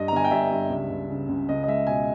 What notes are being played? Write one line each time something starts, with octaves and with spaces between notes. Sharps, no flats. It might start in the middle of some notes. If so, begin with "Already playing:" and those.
Already playing: G2 D#5
A#5
G1 G#5
G5
G2 E5
G2
C#2
C#2
C#3
C#2
C#2 D#5
D#5
G#3 E5
B2 G#5